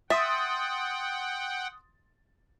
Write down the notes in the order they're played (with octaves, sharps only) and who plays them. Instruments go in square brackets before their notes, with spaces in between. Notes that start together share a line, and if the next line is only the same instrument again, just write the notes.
[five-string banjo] E5 [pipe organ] F#5 G5 [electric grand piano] C6 D#6 A6